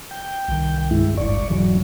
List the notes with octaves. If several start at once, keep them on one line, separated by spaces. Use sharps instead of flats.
G5
C2 D#3
G2 G#3 E4
D#1 G#1 G2 D5 C#6
E1 G#2 C#3 E3 F#3